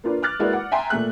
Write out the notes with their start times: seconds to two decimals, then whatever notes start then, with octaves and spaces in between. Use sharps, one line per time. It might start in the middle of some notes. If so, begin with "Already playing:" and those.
0.04 A#3 D4 F4 B4
0.23 D6 F6 F#6 A6
0.39 G#3 A#3 E4 F#4 B4 D5
0.53 F#5 D6
0.72 E5 G5 G#5 A#5 C6
0.90 A#2 A3 F#6